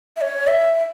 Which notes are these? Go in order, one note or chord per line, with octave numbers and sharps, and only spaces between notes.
E5
C#5
E5